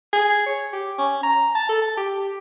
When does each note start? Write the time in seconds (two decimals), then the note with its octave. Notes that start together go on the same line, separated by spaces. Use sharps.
0.13 G#4
0.46 C#5
0.73 G4
0.98 C#4
1.23 A#5
1.55 A5
1.69 A4
1.82 A5
1.97 G4